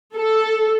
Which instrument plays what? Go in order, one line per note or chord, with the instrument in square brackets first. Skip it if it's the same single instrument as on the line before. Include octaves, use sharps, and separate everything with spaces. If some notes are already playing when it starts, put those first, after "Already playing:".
[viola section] A4